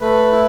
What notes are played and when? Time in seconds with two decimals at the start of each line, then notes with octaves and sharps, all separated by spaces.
0.01 A3 B4
0.32 E4